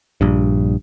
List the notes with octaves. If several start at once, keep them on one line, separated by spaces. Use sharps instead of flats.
A#1 G2